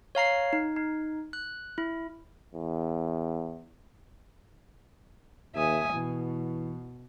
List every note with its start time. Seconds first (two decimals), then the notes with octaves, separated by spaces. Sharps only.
0.15 C#5 F5 A#5 C7
0.53 D#4
0.76 D#4
1.33 F#6
1.78 E4
2.54 E2
5.56 D#2 E5 G#5 D#6
5.93 B2 E3